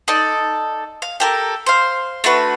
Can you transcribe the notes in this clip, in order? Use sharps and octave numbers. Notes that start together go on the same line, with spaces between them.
D#4 A4 D5
F5
G4 A4 A#4
C5 F5
A3 D4 F#4 B4